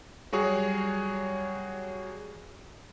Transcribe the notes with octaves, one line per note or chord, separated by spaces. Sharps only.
F#3 G3 F#4 G#4 C#5